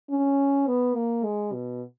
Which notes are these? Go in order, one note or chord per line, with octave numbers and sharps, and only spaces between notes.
C#4
B3
A#3
G#3
B2